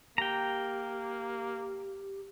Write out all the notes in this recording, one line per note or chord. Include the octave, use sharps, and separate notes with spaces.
A#3 G4 G5 A#5